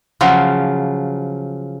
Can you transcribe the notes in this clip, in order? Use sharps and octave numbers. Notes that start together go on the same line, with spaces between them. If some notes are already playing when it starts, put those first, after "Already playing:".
C#3 F3 F#3